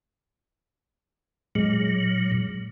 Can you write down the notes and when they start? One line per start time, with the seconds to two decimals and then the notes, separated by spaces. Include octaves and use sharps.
1.55 A#2 F#3 G#3